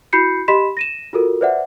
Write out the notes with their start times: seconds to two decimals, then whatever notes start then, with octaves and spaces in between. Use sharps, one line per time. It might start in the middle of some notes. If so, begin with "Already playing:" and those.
0.13 E4 F#4 B5 G6 C7 C#7
0.48 G4 D#5 B5 C6 B6 E7
0.77 A#6 D#7 E7
1.13 F4 F#4 A4 A#4
1.41 B4 C5 D5 E5 F#5